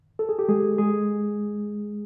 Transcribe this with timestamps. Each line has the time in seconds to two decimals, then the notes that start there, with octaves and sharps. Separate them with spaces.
0.19 A4
0.29 G#4
0.39 G4
0.49 G#3 G#4
0.78 G#3 G#4